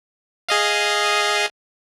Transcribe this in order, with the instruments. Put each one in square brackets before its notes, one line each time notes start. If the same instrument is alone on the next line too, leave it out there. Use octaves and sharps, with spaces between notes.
[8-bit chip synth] G#4 D#5 F5